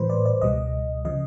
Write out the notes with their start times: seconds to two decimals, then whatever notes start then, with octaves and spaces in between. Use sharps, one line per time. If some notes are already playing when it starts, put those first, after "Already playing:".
Already playing: A2 E3 G3 B4 C5
0.10 D5
0.26 D5
0.42 C#2 B2 G3 D#5
1.05 C#3 F3 D#5